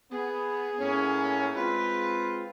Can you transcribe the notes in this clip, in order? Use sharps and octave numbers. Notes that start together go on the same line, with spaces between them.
B3 G#4
A2 A#3 C#4
G#3 C4 F4 B4